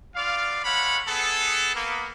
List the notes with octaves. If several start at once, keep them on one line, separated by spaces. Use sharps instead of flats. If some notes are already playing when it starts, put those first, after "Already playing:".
B3 F4 D5 F5
G#3 A3 C#5 F5 F#5 B5
B3 G#4 A4
A#3 B3